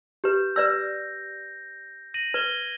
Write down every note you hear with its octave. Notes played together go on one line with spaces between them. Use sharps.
G4 B4 G6
B4 D5 E6 A#6
A#6 D#7 F#7
B4 G#6 G7